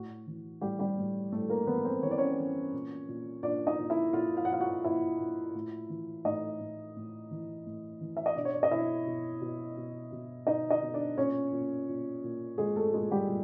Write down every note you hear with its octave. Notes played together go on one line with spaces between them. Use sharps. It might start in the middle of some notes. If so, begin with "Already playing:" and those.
Already playing: A2 F#4
E3
A2 G3 G4
G3 G4
A2
A2 A3 A4
A#3 A#4
E3 B3 B4
C4 C5
E3 C#5
D5
C#4 C#5
E3
A#2
A#2
A#2 D4 D5
D#4 D#5
A#2
E4 E5
A#2 F4 F5
F5
F#5
A#2 F4 F5
F#4 F#5
A#2 E4 E5
A#2
A2
E3
A2 D#4 D#5
A2
A2
E3
A2
E3
E5
D#5
B2 D4 D5
C#5
D5
D#5
B2 E4 E5
B2
B2
B2
B2
B2 D#4 D#5
D#4 D#5
B2
D4 D5
A#2 C#4 C#5
A#2
A#2
A#2
A#2 G#3 G#4
A3 A4
A#2 G#3 G#4
G3 G4
A#2